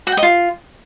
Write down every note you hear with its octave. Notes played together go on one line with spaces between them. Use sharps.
F#4
G5
D#5
F4